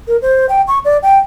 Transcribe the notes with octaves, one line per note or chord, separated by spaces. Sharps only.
A#4
C5
G5
C#6
D5
G5